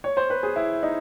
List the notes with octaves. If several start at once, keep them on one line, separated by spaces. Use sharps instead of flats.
C#5
C5
B4
G#4
E4
D#4